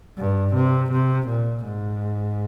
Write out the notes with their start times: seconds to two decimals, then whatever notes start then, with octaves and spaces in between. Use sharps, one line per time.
0.18 G2
0.54 C3
0.92 C3
1.28 A#2
1.65 G#2